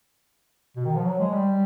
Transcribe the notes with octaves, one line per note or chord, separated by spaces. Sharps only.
B2
D#3
F3
F#3
G#3
G3